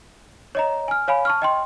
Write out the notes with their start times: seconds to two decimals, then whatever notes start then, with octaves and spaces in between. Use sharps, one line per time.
0.55 C#5 D#5 A#5
0.88 G#5 F6
1.08 C#5 F5 G#5 B5
1.25 A5 C#6 F6
1.42 D#5 G5 C6